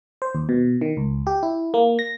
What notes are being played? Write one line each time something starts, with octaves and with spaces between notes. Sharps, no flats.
C5
D#2
B2
D#3
C#2
G4
E4
A#3
A#6